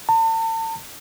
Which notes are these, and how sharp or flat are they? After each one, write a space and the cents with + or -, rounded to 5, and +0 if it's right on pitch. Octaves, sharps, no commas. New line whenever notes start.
A5 +40